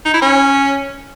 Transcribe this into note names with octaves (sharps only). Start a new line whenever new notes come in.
D#4
E4
C#4